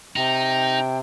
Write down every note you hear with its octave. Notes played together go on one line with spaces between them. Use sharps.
C3 D#4 G5